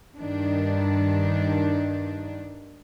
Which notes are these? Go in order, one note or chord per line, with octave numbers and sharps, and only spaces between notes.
G2 D#3 D4